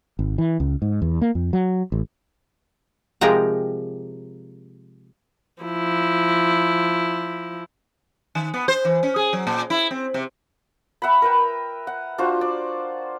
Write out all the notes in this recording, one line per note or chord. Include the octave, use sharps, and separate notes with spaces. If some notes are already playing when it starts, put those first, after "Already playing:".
G#1
E3
C#2
G#2
E2
A#3
F2
F#3
A1
C3 F3 G#3 A#4 G5 A#5
F3 E4
D#3
B3
C5
E3
C#4
G#4
F#3
A#2
E4
C4
C3
E5 F#5 A#5 B5
A#4 B4 G5
F#5
D4 F4 F#4 C5
D5